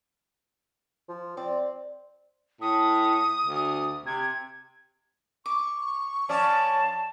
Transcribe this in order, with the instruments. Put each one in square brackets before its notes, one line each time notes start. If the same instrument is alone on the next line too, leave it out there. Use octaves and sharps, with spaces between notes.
[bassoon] F3
[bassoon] C4 [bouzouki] D5
[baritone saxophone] A2 [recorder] D#6
[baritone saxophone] D2
[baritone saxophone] C3 [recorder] G#6
[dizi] C#6 [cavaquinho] D6
[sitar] F3 C#4 D5 [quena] A5